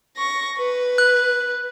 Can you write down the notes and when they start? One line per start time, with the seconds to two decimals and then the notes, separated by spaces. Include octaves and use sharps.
0.17 C#6 A#6
0.57 B4
0.98 F#6